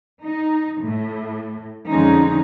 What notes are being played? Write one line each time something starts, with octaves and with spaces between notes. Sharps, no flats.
D#4
A2
F2 D3 F3 G#3 C#4 D#4